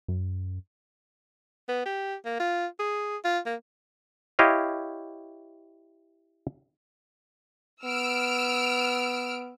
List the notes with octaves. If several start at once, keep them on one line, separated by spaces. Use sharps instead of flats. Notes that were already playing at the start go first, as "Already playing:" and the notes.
F#2
B3
G4
A#3
F4
G#4
F4
A#3
E4 G4 C#5 D#5 F5
B3 E6 F6 D7